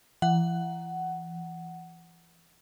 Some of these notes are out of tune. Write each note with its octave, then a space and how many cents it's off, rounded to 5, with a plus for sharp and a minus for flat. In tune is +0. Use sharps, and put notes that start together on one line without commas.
E3 +40 F#5 +10